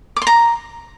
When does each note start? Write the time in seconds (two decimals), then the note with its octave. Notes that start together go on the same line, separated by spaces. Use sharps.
0.16 D6
0.22 C6
0.27 A#5